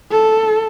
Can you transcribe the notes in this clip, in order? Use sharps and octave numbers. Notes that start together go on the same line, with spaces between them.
A4